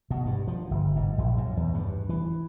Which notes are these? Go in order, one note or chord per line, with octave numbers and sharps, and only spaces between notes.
B2
G2
F3
G1
G#2
A#1
F#2
E2
G2
E3